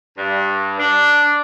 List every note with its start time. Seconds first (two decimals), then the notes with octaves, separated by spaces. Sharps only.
0.18 G2
0.79 D4